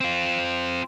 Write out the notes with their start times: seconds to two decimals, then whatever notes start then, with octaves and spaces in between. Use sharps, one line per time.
0.01 C4 F4